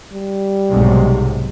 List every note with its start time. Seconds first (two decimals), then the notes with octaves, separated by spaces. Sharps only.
0.13 G3
0.70 B1 G#2 C3